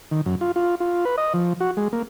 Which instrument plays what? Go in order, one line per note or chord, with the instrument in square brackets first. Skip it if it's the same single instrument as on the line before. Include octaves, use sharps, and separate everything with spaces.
[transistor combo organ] D#3
F#2
F4
F4
F4
B4
D#5
F3
F#4
G#3
A#3